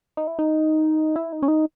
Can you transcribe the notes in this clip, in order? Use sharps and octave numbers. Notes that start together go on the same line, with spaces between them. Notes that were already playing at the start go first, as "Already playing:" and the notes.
D#4
E4
D#4
E4
D#4
C#4
D#4